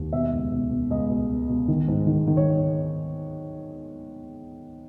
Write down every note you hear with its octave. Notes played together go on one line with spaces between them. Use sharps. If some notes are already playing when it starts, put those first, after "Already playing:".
Already playing: D#2
B2 E5
C#2
B2
B2
C#2 D#5
B2
B2
B2
D#3
G#2
D#3
D#3
C#5